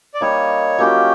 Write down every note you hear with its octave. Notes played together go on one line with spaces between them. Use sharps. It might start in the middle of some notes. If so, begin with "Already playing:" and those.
D5
G3 A#3 D#4 C#5
F#3 A#3 C#4 F4 G4